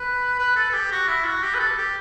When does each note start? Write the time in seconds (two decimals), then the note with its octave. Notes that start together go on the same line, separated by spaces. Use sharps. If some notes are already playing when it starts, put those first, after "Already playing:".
Already playing: B4
0.39 B4
0.56 A4
0.70 A4
0.74 G4
0.91 F#4
1.08 E4
1.26 F#4
1.43 G4
1.54 B4
1.60 A4
1.78 G4